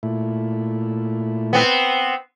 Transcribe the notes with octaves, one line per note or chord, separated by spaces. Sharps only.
A#2 A3 E4
B3 C4